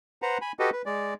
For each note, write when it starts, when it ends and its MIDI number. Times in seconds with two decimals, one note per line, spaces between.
0.22 0.38 71
0.22 0.38 72
0.22 0.38 78
0.22 0.38 82
0.41 0.52 80
0.41 0.52 83
0.59 0.70 66
0.59 0.70 67
0.59 0.70 69
0.59 0.70 71
0.59 0.70 75
0.73 0.82 71
0.86 1.14 56
0.86 1.14 74